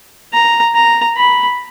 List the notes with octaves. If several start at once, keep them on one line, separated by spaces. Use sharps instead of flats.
A#5
A#5
B5